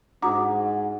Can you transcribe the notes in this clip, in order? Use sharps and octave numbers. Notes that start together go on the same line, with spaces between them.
G#2 D4 F#4 F#5 A#5 D6 D#6